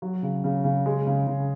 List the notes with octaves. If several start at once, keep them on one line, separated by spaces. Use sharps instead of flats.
F#3
C#3
C#3
C#3
G#3
C#3
C#3